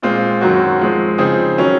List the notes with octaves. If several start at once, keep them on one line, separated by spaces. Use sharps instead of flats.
A#2 G#3 C4 F4
F#2 D#3 F#3 C4 F#4
F3 G#3 C4
C#3 F3 C4 D#4 G#4
D#3 F#3 C#4